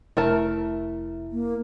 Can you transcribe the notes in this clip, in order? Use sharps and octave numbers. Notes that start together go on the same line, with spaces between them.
F1 A3 E4 A#4 A5
A#3